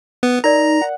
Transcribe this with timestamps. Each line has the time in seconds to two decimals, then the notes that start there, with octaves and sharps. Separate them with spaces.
0.23 B3
0.44 D#4 A#4 D5 A#5
0.81 F#5